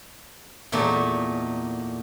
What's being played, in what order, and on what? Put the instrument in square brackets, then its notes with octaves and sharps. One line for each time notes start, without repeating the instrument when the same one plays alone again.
[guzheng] E2 A#2 A3 D#4